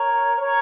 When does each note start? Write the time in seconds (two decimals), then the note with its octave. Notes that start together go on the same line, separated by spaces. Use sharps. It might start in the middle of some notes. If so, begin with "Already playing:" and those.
Already playing: A#4 C#5 A#5 C#6
0.40 A#4 C#5 A#5 C#6